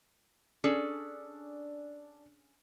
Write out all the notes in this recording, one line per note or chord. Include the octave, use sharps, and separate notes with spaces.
C#4 D4 G#4 A4